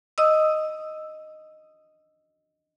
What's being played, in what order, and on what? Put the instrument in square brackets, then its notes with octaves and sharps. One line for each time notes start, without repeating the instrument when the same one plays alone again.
[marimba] D#5 D#6 E6